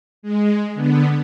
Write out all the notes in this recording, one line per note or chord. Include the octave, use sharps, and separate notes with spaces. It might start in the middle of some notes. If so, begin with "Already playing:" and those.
G#3
D3 B3